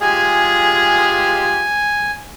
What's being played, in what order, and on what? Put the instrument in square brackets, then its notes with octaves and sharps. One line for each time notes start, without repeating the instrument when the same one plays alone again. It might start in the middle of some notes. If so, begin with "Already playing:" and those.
[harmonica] G#3 F4 G4 [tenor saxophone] G#4 [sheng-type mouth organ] G#5